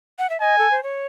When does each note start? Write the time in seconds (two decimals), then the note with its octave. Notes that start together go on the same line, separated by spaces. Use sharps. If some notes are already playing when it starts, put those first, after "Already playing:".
0.19 F#5
0.30 E5
0.40 D#5 G#5
0.58 A4
0.71 C5
0.83 C#5